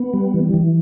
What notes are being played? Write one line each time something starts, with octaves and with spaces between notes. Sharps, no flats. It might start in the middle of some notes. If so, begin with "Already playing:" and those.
Already playing: B3
G3
E3
E3